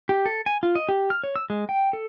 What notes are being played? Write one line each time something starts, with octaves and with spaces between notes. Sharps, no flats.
G4
A4
G#5
F4
D#5
G4
F6
C#5
E6
G#3
G5
A4